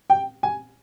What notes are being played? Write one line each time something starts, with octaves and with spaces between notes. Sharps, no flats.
G5
G#5